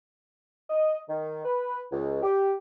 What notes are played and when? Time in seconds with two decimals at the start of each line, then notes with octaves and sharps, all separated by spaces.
0.70 D#5
1.09 D#3
1.45 B4
1.92 C#2
2.23 G4